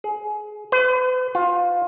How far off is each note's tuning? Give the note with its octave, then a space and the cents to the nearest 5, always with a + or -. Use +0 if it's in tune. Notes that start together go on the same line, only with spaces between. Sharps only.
G#4 +20
B4 +45
F4 +20